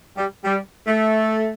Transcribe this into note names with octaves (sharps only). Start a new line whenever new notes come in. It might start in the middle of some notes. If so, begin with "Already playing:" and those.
G3
G3
A3